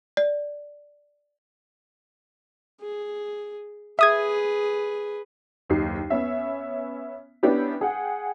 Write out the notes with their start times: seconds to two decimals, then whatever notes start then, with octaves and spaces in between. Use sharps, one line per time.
0.17 D5
2.81 G#4
3.99 G#4 B4 E5 D#6 G#6
5.69 F#1 D#2 D#4 G4 C7
6.10 B3 C#4 E5
7.43 B3 C#4 D4 E4 G4 B4
7.81 G#4 F#5 G5